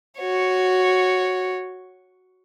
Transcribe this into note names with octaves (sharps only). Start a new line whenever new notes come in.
F#4 C#5